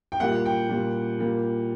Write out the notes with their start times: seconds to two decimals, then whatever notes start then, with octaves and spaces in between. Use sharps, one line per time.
0.12 G5
0.20 A#2 G3 A#3 F#5
0.46 G5
0.69 A#2 G3 A#3
1.18 A#2 G3 A#3